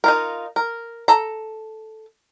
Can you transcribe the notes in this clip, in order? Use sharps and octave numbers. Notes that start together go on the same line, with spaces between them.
D#4 F4 A#4
A#4
A4 A#5